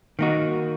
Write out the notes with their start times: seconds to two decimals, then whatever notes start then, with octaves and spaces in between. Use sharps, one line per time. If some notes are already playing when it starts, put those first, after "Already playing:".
0.19 D#3 A#3 D#4 F#4